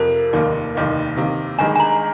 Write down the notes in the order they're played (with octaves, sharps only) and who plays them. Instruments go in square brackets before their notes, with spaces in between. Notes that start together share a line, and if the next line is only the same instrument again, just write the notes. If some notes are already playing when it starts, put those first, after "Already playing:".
Already playing: [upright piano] F2 C3 F3 [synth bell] A#4
[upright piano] F1 D#2 D#3 A#3
F1 D#2 D#3 A#3
C3 D#3 A#3
[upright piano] G1 G2 D#3 G#3 [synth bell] G#5
[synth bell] G#5
A#5